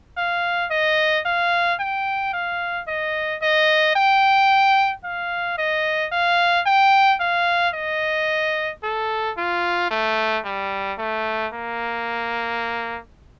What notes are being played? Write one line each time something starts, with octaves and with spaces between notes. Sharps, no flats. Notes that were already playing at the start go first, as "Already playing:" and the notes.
F5
D#5
F5
G5
F5
D#5
D#5
G5
F5
D#5
F5
G5
F5
D#5
A4
F4
A3
G3
A3
A#3